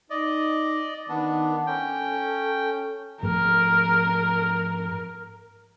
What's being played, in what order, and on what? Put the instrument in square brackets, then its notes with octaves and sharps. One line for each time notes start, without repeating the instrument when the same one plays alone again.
[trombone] D#4 [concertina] D5 D#5
[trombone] D#3 [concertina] B3 D4
[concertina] C#4 G5 [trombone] A4
[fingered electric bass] G#2 F3 A3 [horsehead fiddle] A#4